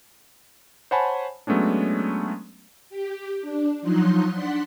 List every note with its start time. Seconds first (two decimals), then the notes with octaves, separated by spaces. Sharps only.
0.91 C5 C#5 F#5 G#5 A5 B5
1.47 F#3 G#3 A3 B3 C#4 D4
2.90 G4
3.41 D4
3.82 F3 F#3 D#4 C6 F#6
4.31 D4 F#5 C6 B6